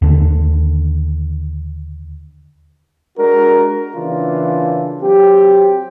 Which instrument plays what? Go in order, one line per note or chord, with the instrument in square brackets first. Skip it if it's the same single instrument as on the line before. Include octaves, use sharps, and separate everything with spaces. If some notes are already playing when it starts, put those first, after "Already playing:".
[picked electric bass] D#2 D3
[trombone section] G#3 D4 F#4 A#4
C#3 E3 A#3 D4 F4
F#3 C4 G4